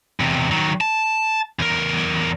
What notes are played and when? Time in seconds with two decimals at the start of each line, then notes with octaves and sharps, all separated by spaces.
0.20 E2 C3
0.51 D#3 F#3
0.81 A5
1.59 E2 A#4